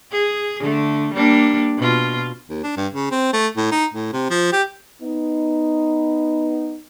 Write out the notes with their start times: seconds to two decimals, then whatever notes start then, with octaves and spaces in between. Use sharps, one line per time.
0.12 G#4
0.60 D3 A3
1.13 G3 A#3 D4
1.78 B2 F4
2.49 D#2
2.64 D4
2.77 G2
2.93 C#3
3.11 C4
3.33 A3
3.57 A2
3.71 D#4
3.94 A2
4.13 C3
4.30 F3
4.52 G4
5.02 B3 D#4